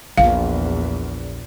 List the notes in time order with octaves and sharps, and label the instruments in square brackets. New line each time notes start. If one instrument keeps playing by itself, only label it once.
[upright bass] A#1 [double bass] E2 A#2 [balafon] F5